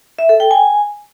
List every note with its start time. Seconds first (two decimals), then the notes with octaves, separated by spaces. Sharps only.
0.19 E5
0.29 A4
0.40 G5
0.51 G#5